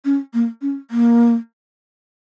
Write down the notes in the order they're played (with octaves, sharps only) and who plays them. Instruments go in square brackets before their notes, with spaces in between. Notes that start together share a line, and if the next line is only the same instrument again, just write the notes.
[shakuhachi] C#4
A#3
C#4
A#3